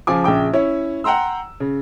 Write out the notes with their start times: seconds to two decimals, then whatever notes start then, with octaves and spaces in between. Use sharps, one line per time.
0.07 C#3 F3 F4 G#5 D6
0.24 A#1 C#3 G5 D6
0.53 C#4 E4 C#5
1.04 F#5 G5 A#5 C6 E6
1.60 C#3